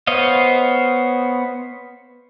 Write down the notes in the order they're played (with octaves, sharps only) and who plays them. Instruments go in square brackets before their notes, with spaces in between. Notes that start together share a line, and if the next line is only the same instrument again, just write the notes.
[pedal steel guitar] B3 C5 C#5 D#5 F5